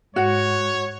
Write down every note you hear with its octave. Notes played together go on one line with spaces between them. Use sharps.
G#2 F#4 C#5